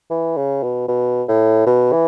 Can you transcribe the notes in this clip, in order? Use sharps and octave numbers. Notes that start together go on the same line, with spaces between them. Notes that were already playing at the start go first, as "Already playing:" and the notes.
E3
C#3
B2
B2
A2
B2
E3